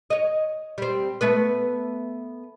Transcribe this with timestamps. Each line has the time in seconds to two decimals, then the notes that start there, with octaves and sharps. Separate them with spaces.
0.10 C#5 D#5
0.78 G3 C4
1.21 A3 B3 B4